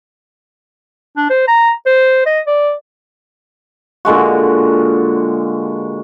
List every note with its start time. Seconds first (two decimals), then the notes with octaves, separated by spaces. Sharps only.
1.17 D4
1.30 C5
1.48 A#5
1.86 C5
2.26 D#5
2.47 D5
4.05 A#2 D3 G#3 F#4